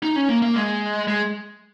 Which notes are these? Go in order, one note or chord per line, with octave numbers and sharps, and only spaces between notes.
D#4
C#4
A#3
A#3
G#3
G#3